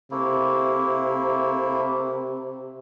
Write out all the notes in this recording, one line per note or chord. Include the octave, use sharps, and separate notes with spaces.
C3 A3 A#3 E4